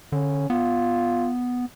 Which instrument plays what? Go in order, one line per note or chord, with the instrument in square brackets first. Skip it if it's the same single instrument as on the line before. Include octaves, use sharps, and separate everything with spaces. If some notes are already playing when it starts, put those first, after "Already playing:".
[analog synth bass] D3 [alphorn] C#4
[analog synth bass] B3 [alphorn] F4